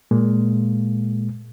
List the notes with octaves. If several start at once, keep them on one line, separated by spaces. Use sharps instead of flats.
A#2 G#3 A#3